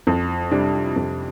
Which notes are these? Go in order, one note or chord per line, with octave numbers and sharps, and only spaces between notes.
F2
C3 G3 D4
F2